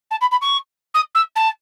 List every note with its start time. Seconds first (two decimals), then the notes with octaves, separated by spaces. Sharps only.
0.11 A5
0.21 B5
0.31 B5
0.41 C#6
0.94 D#6
1.15 E6
1.36 A5